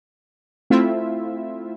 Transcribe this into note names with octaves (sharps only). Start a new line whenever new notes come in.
A3 C4 E4 F4 E5